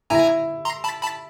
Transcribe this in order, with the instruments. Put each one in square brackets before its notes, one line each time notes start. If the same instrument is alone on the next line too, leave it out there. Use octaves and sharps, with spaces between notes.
[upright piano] E4 [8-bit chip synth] G#5 A#5
[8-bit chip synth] A#5 C6
A5 B5
A5 B5